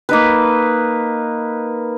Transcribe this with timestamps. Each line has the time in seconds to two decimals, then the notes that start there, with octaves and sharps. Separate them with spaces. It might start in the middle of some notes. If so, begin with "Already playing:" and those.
0.09 A#3 D#4 B4